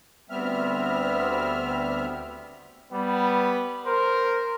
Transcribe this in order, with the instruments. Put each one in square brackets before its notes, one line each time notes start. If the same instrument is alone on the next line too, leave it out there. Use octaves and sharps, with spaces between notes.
[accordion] D2 G3 B3 C4 E5 F6
[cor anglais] G3 [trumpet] B3
[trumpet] A#4 [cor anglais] C5